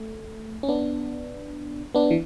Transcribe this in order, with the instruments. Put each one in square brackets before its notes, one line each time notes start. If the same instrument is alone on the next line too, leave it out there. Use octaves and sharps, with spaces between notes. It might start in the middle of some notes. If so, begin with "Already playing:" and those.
Already playing: [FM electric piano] A3
C#4
B3 D4
B3 D4
E3